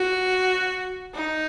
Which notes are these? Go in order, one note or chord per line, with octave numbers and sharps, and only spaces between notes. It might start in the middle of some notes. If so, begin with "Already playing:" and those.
Already playing: F#4
D#4